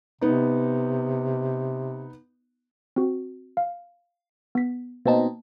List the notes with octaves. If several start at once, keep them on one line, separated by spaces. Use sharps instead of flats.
C3 B3 D#4
C4 F#4
F5
B3 B6
B2 A#3 C4 D#4 A5